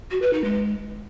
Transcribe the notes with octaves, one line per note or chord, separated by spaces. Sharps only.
F#4
B4
D#4
G#3